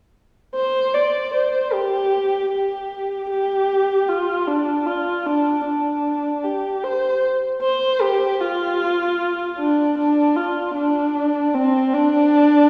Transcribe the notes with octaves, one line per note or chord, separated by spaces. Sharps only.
C5
D5
C5
G4
G4
G4
F4
D4
F4
D4
D4
G4
C5
C5
G4
F4
D4
D4
F4
D4
C4
D4